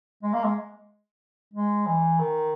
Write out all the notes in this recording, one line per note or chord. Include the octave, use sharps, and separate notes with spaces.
G#3
A#3
G#3
G#3
E3
D#3